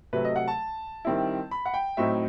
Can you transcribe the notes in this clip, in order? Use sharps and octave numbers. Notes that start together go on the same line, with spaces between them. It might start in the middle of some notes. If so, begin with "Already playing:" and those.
C3 F#3 A3 B4
D#5
F#5
A5
D#3 G3 C4 E4
B5
F#5
G5
A2 F#3 C4 D#4 E5